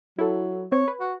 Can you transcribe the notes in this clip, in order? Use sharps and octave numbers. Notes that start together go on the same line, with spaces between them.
F#3 E4 A4
C4 C#5
B4
F#4